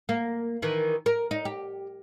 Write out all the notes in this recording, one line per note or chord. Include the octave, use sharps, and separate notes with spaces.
A#3
D#3 E3
A#4
D#4
G4